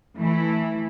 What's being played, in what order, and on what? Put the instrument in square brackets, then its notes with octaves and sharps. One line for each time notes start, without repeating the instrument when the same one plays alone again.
[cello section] E3 A3 E4